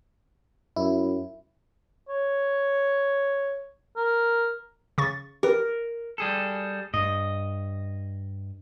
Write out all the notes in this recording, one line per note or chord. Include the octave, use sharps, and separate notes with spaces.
F#2 E4
C#5
A#4
C#3 C#6 A6
G4 A#4 B4
G3 G#4 A4
G2 D#5